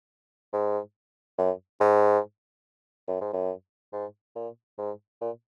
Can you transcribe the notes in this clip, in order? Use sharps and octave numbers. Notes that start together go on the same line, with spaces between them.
G#2
F#2
G#2
F#2
G#2
F#2
G#2
A#2
G#2
A#2